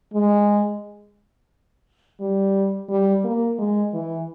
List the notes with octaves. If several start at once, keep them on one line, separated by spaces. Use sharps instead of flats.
G#3
G3
G3
A#3
G#3
E3